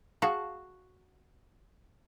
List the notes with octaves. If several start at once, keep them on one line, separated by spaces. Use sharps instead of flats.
F#4 G#4 F5 A5